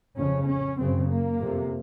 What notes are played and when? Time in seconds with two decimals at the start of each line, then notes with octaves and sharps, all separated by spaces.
0.17 F2 C#3 C#4
0.47 C#4
0.79 F#2 C#3 C4
1.11 A#3
1.41 F2 C3